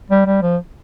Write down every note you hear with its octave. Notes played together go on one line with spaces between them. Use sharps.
G3
G3
F3